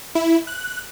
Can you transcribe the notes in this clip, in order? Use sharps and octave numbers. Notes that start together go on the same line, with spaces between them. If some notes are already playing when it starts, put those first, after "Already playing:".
E4
F#6